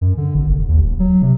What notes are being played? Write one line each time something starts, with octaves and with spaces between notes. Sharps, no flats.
F#2
D3
G#1
F1
D#2
D#1
F#3
C3